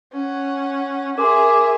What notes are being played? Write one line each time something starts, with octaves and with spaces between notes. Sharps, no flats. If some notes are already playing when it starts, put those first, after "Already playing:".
C#4 F#5
G#4 A#4 E5 G#5 C6 D6